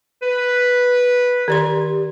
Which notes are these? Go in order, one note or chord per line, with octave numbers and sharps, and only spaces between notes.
B4
D#3 G4 D5 C6